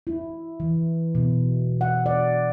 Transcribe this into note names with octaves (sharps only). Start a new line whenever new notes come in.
E4
E3
B2
F#5
D5